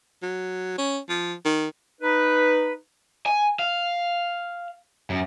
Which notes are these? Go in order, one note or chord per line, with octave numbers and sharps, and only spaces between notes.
F#3
C#4
F3
D#3
D#4 B4
G#5
F5
F#2